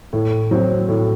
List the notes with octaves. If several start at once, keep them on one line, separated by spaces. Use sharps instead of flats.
A2
F#3 C4 F#4
A2